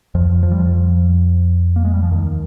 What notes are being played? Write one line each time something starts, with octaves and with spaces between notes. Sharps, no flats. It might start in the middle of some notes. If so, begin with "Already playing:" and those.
F2 F3
F3
G3
F2 F3
A#3
G#3
G3
F3
D#2 D#3